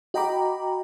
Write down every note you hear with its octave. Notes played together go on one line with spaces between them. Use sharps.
F#4 D#5 G5 A#5 B5 D6